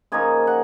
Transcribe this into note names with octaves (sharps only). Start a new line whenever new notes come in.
C#3 F3 A#3 D#4 G#5
F#5